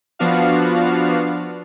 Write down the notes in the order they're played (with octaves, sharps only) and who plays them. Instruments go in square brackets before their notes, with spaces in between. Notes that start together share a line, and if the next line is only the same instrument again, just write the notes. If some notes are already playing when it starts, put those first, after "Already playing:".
[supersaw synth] F3 B3 D4 F#4 F5